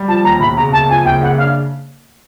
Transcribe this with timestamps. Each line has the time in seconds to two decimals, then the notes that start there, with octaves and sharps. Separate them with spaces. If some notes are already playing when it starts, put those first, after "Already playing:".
Already playing: G3
0.08 F3 A5
0.24 D#2 A#5
0.40 E1 B5
0.57 C#3 A#5
0.72 F#1 A5
0.89 F2 G#5
1.05 F#1 G5
1.21 C#3 F#5
1.38 D4 F5